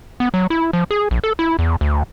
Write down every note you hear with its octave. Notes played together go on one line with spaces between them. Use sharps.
B3
F#3
E4
F3
G#4
A#1
A4
E4
E2
D2